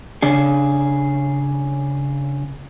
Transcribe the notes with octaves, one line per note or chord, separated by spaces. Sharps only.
C#3 D4 G#4